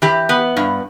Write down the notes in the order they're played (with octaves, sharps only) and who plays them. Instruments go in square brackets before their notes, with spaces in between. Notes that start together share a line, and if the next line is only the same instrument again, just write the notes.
[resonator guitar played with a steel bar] E3 G4
B3
G2